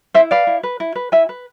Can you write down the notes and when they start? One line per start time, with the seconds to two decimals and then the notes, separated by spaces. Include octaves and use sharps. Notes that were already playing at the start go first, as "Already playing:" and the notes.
0.14 E4 C5 E5
0.31 B4 D5 F5
0.47 E4
0.63 B4
0.80 E4
0.95 B4
1.12 E4 E5 G#5
1.29 B4